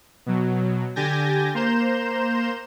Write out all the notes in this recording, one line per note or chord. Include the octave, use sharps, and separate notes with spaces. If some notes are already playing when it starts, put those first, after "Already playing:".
B2 F#3
D3 G4 G#5 G6 A6 A#6
A#3 C5 A#5 C6 G6 E7